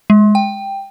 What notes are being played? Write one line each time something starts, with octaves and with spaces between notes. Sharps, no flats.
G#3
G5